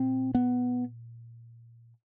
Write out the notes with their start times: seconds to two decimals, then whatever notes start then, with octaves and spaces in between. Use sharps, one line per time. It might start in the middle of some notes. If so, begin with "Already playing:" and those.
Already playing: A#2 C4
0.35 B3